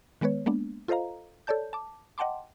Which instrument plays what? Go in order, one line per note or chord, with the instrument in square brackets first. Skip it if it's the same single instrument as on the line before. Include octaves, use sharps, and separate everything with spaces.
[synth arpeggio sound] D#3 G#3 B3 B4 C#5
G#3 A#3 B3 D4
F4 A4 C5 D#5 F5 A#5
A4 C#5 D5 A5 G6
A5 D6
D#5 F#5 G5 A5 C6 D6